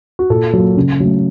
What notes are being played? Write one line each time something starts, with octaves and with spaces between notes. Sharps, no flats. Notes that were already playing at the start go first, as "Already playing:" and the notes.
F#4
A#2 A4
F#3 A#3
C#3
F#3 A3